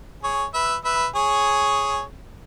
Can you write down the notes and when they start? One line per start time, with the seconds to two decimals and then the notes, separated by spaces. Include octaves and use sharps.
0.23 G#4 C#5
0.54 B4 E5
0.85 B4 E5
1.15 G#4 C#5